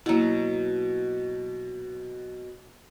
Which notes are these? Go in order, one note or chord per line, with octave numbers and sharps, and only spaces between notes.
B2 F#3 A#3 E4